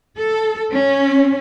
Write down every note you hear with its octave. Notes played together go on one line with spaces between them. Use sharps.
A4
C#4